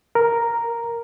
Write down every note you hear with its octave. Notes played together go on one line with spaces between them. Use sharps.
A#4